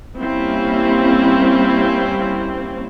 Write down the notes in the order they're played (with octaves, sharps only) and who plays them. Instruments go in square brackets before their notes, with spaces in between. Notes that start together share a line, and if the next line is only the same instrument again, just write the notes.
[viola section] G3 A#3 C4 C#4 E4